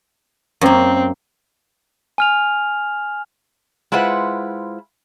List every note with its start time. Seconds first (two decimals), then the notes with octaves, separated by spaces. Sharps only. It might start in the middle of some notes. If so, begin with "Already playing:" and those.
0.61 F#2 A#3 C4
2.18 G#5 F6 F7
3.92 G#3 E4 F4 B4 C5 F#5